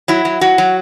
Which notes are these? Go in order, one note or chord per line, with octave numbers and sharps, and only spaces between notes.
F#3 E4
F#3
F#3 F#4
F#3